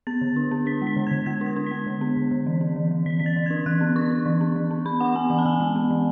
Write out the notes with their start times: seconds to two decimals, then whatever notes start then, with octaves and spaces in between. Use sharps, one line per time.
0.07 B3 A6
0.21 D3
0.36 D4
0.51 B3
0.66 D4 B6
0.82 G#3
0.87 B6
0.96 D3
1.07 D3 G#6
1.26 G#3 G#6
1.41 D4
1.46 G#6
1.56 D4
1.66 G#3 B6
1.86 D3
2.01 B3
2.17 D3
2.31 D3
2.47 E3
2.61 B3
2.76 E3
2.91 E3
3.06 E3 B6
3.20 E3 B6
3.26 A6
3.36 E3
3.46 D4 G#6
3.66 E3 F#6
3.81 B3
3.96 D4 C#6
4.11 D4
4.26 E3
4.41 B3
4.56 E3
4.71 B3
4.85 B3 B5
5.00 D4 F#5
5.15 B3 G#5
5.30 E3 F#5
5.39 A5
5.45 E3 G#5
5.60 G#3
5.76 B3
5.91 E3